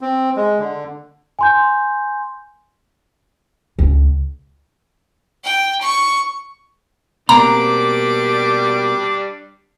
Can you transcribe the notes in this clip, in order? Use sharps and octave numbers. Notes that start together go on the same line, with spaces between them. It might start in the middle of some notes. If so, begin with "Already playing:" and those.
C4
G#3
D3
G#5 C6 G6
C#2
G5
C#6
B2 G3 A#3 C4 D4 A#5 D6